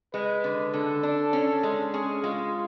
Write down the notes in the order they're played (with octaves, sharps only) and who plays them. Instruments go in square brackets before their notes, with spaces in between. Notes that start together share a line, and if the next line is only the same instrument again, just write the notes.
[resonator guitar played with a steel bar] G#3 [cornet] B4
[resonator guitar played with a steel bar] D3
[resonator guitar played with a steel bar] D3 [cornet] A4
[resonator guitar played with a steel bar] D4
C#4
G#3
[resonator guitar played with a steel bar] C#4 [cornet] G#4
[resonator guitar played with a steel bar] G#3 [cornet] F4